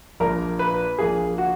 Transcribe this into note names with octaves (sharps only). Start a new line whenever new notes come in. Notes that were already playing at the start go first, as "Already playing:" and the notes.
A#1 A#2 A#3 A#4
B4
A#1 A#2 A#3 G#4
F#4